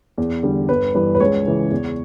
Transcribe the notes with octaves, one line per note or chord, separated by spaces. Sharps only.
E2
D3 G3
G1 B4
G2 E3 B4
B4
C#2 C#5
C#3 E3
E2